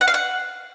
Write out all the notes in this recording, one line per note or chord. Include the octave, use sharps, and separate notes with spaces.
F#5
F5
F#5